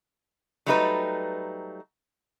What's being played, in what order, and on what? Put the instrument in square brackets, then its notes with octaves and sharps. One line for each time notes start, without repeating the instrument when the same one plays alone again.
[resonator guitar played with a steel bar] F#3 G3 A3 D#4 G4 B4